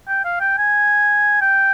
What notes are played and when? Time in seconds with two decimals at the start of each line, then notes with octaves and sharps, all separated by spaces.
0.08 G5
0.25 F5
0.40 G5
0.58 G#5
1.42 G5